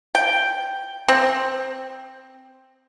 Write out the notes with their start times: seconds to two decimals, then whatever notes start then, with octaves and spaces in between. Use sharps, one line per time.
0.15 G5
1.08 C4